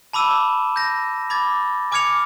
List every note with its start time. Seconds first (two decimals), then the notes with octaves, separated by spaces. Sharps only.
0.13 A5 B5 D6 E6 D#7 E7
0.76 G6 A#6
1.30 B5 D6 G#6 A6
1.92 G#5 D6 F6 G#6 C#7 F7